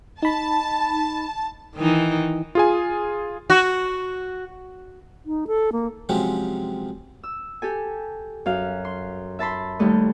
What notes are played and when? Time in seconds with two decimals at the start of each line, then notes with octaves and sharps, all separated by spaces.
0.22 D#4 A5 B5
1.75 D#3 E3 D#4
2.55 F4 G#4 G#5
3.50 F#4
5.26 D#4
5.47 A4
5.73 A#3
6.09 C3 F3 F#3 G#3 C4 C#4
7.23 E6
7.62 G4 A4 G#5
8.46 F#2 F5
8.85 C6
9.39 E5 A5 B5 C6
9.79 D#2 G3 A3 D#5